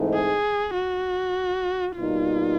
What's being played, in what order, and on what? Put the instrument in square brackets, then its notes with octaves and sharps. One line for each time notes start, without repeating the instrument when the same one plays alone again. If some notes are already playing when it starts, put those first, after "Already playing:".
Already playing: [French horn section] G#2 E3 A3 C4 D#4
[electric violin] G#4
F#4
[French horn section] B2 G3 A#3 D#4 [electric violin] F4